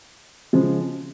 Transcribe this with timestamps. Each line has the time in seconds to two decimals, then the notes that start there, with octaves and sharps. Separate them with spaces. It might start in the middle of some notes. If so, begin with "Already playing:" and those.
0.53 C#3 F3 G#3